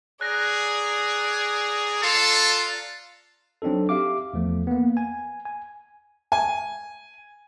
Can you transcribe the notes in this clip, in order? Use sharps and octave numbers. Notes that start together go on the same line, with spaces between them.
G#4 D5 A#5 F#6 A#6
F4 A4 A6 C7
F#3 C4 D4 D#4 A4
G4 E5 F5 D6
E2 F3 A3
A#3 B3
G#5
G#5
G#5